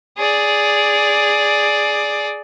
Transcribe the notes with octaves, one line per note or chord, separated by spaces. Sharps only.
G#4 D5